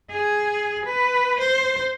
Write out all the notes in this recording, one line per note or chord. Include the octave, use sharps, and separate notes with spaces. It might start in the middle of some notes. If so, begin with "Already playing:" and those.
G#4
B4
C5